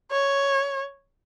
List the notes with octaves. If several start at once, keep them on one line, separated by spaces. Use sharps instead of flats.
C#5